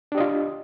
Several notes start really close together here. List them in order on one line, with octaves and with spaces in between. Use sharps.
D4 G4 D#5 F4